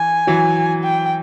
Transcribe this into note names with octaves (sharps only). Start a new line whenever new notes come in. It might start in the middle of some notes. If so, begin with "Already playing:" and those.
Already playing: E3 G#5
E3 F#3
G5